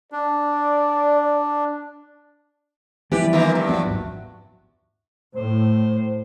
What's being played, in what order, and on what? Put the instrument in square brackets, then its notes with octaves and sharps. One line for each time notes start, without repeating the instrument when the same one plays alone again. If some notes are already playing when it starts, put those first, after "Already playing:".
[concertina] D4 [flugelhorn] D5
[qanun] E3 B4 D5 [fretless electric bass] F3 G3 B3 [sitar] G4
[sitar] D#3 E3 A#3 [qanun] F4 E5 A#5
[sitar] G2
[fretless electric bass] F3 F#3 B3 [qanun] F#4
[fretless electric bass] G#1 D#2
[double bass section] A2 [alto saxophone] C5